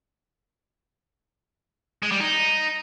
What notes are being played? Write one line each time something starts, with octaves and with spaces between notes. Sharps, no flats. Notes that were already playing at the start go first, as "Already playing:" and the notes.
G#3
G3
D#4